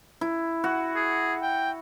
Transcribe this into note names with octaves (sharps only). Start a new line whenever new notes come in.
E4
F#4
G#4
G5